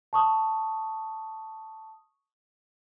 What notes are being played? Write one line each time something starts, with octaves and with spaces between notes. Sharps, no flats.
A5 C#6 D#6